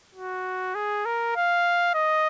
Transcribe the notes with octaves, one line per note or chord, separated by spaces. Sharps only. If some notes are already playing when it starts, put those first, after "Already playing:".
F#4
G#4
A#4
F5
D#5